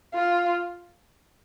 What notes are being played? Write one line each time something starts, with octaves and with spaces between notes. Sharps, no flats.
F4